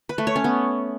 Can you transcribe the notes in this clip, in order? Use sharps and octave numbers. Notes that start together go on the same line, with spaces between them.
B4
A3
C#5
C#4
B3